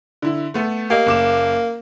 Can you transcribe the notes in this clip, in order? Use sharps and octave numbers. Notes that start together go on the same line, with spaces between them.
D3 E4
A3 B3 A4
A#3 G4 D#5
F#1 D6 E7